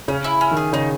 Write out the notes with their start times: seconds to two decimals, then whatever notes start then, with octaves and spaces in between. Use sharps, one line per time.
0.08 C#3 C#4
0.24 E4
0.41 C#4
0.51 D#3
0.57 G#4
0.73 C#3 D#4